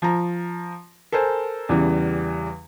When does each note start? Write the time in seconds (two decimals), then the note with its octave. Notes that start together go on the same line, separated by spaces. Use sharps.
0.02 F3 A#5
1.12 A4 A#4 C5 G#5
1.69 E2 C#3 E3 G3